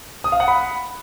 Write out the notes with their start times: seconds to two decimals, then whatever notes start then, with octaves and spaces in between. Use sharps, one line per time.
0.24 D#6
0.32 F5
0.40 F#5
0.48 B5